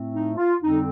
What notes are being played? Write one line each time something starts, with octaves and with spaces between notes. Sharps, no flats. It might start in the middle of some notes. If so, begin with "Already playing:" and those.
Already playing: A2 A3 C4
D#4
F4
F2 D3 G3 C4 D#4